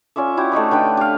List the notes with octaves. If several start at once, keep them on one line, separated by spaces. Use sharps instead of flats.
C#4 F4 D5 E5
E4 F#4 G4
A3 D#4 D#5 B5
D3 B4 G5
G4 F5